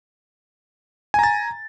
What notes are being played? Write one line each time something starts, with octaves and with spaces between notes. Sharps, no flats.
G#5 A#5 A6